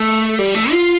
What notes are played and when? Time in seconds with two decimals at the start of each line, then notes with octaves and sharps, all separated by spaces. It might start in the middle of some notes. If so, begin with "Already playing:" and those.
Already playing: A3
0.39 G3
0.55 A3
0.71 F4